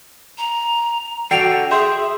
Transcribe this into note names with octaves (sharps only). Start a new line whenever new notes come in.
A#5
F#4 A4 D5 F#5 G5 C7 D7 F7
G#4 E5 C6 G6